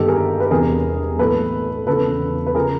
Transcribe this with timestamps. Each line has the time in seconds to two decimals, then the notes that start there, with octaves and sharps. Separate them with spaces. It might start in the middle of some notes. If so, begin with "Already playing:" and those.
Already playing: G1 G2 D#3 G4 A4
0.08 G#4 A#4
0.40 B4
0.51 E1 E2 C3 E3 G#4 A#4
1.19 B1 A2 E3 A4 B4
1.87 E1 E2 C#3 F3 A4 B4
2.46 B4
2.55 C#3 F3 G#4 A#4